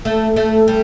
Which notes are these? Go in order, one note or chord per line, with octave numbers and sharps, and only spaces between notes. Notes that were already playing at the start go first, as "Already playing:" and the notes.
A3
A3
G3